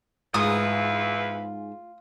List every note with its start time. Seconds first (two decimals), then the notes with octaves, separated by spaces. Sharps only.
0.34 E2 G#2 E3 F4 B4 D#6